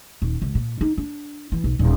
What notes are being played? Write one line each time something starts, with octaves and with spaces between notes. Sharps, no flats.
D#1
C#2
A#2
D#4
D4
E3
B1
D#1